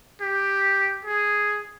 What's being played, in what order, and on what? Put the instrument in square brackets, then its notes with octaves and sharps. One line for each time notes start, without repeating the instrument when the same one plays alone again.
[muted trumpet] G4
G#4